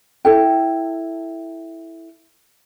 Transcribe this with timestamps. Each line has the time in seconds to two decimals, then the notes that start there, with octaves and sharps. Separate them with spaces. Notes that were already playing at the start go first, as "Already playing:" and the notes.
0.25 E4 A4 G5